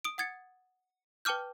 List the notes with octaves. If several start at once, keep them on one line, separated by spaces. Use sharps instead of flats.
D#6 D7
F#5 D#6 G#6 A6 C#7
B4 G5 A5 D6 F6 G6